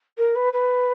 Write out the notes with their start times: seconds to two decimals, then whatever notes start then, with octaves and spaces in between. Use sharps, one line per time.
0.18 A#4
0.35 B4
0.53 B4